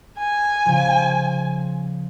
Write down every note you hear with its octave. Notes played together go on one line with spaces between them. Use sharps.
G#5
C#3 F3